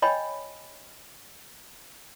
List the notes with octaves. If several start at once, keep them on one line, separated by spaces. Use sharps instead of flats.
C#5 D#5 G5 G#5 B5